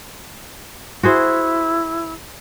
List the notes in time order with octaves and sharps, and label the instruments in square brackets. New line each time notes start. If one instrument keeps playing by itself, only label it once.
[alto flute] E4 [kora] F#4 G#4 C5